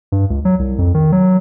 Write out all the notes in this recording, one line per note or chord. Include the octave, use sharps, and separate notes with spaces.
G2
C#2
F#3
C2
F2
D#3
F#3